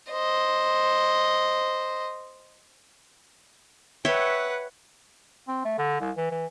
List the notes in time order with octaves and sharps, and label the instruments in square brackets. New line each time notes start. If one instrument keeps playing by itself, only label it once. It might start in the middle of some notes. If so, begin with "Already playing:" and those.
[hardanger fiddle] C5 D#5
[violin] B4 F#5 [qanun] C#5 E5 G5
[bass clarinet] C4
A3
D3
C2
E3
E3